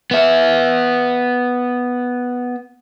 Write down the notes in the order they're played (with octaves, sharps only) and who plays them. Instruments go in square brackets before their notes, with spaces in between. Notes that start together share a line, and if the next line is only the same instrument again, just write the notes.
[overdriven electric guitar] B3 E5